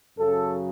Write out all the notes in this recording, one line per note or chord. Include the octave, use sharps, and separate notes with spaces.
F#2 C#3 F#3 A4